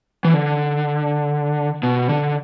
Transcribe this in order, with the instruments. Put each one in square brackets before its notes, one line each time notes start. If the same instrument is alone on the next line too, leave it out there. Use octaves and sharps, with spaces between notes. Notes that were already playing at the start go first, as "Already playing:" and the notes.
[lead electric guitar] E3
D3
B2
D3